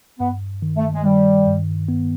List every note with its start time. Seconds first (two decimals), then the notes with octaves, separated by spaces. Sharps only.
0.19 G2 B3
0.62 D#3
0.77 A3
0.94 G#3
1.04 D#3 G3
1.47 G2
1.88 B3